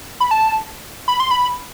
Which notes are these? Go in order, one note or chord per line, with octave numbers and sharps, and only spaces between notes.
B5
A5
B5
C6
B5